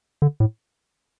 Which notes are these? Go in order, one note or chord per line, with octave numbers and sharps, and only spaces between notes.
D3
A2